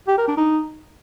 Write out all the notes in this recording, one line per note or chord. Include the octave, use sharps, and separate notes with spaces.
G4
A#4
D4
D#4